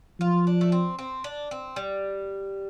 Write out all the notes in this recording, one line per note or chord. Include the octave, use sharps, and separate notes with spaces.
F3 F4
D4
A3
C4
C4
D4
C4
G3